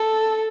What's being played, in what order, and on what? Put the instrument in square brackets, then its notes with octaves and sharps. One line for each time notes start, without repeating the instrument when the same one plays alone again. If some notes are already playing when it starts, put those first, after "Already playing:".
Already playing: [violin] A4